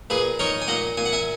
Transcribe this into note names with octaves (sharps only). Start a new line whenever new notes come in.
A#2 G#4 B4
D#4 A#4 C#5
G#5
A#2 D#5 F#5
A#2 G#5
F#5
E5 G#5